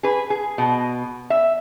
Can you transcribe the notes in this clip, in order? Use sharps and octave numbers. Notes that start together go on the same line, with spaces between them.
G#4 B4
G#4
B2
E5